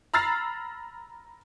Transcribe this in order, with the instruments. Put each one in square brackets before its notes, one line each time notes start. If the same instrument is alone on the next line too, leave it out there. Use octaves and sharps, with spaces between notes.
[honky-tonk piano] A#5 B5 E6 F6 A6 C7